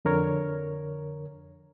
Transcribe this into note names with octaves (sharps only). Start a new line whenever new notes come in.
F2 D3 A#4 C#5